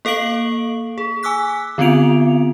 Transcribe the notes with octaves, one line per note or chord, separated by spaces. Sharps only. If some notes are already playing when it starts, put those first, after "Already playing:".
A#3 A4 F5 D7 F#7
G#4
G#5 D6 E6 F#6 B6
D3 B3 C4 F4 D7 F7